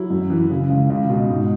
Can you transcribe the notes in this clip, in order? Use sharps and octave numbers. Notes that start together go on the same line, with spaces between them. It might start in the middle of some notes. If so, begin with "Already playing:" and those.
Already playing: F#3 E4
F#2
E3
C#3
C#2
C#2
B2
G#2